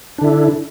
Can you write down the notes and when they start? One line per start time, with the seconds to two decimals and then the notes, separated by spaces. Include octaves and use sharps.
0.18 D4
0.21 D3
0.24 E4